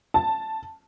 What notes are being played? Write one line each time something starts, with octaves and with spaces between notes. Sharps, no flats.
A5